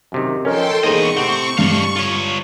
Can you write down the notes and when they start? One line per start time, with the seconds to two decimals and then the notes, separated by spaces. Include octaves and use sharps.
0.12 F#2 C3 D#3
0.45 F3 C#4 A4 A#4 C#5 D#5 G5 C6
0.83 E2 A#3 D#4 G#4 C5 D#5 C#6
1.17 A2 C3 C4 F#5
1.58 G2 A4 F5 F7
1.96 F4 C#5